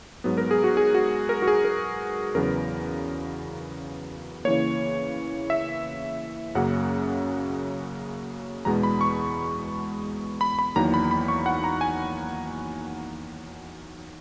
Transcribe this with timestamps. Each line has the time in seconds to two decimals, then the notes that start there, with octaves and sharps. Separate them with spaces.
0.24 G#2 F#3 B3
0.37 A#4
0.51 G#4
0.64 F#4
0.77 G#4
0.94 F#4
1.29 A#4
1.42 F#4
1.48 G#4
1.64 A#4
2.35 E2 C#3 F#3 B3 A#4
4.45 C#3 E3 A#3 C#5
5.50 E5
6.55 F#2 C#3 F#3 A#3 F#5
8.65 E2 B2 G#3 B3 A#5
8.83 B5
9.01 C#6
10.41 B5
10.59 B5
10.76 E2 D#3 F#3 A#3 A#5
10.94 B5
11.11 B5
11.28 C#6
11.46 F#5
11.64 A#5
11.81 G#5